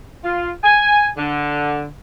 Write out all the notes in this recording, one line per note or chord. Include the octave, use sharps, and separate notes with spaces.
F4
G#5
D3